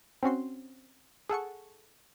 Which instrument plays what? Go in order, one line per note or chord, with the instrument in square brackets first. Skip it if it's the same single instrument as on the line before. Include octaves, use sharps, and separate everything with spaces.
[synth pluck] C4 C#4 F#4 C6
G#4 A4 F#5 C#6